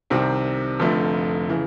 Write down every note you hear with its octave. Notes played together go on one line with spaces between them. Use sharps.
C2 C3 D#3 G3 C4
F1 F2 D3 F3 A3
C#3 E3